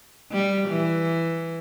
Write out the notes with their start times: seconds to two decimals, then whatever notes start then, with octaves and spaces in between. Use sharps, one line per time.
0.31 G3
0.69 E3